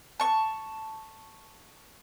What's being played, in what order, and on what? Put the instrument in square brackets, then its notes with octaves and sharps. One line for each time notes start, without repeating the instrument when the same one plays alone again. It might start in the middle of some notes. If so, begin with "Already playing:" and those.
[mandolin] A5 C#6